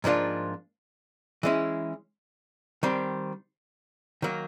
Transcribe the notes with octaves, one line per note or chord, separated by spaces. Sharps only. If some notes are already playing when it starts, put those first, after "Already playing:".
G#2 F3 A#3 D4 F4
E3 G#3 C#4 E4
D#3 G3 C4
D#3 F#3 A#3